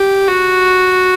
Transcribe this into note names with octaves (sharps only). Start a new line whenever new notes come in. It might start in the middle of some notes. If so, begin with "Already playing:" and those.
Already playing: G4
F#4